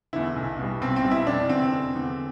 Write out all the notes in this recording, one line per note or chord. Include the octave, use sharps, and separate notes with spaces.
E2 D3 E4
B1
B2 G3
B1 C4
C4
B2 G3
E4
F1 D4
E2 D3 C4
F1
E2 D3